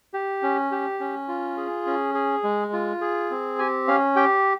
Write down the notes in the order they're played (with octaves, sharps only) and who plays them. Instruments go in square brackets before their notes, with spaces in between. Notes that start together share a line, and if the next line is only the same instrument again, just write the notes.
[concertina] G4
C#4
G4
C#4
F4
G#4
C#4
G#4
G#3
F4
G#4
C4
G4 G#5
C#4 F5
G4 G5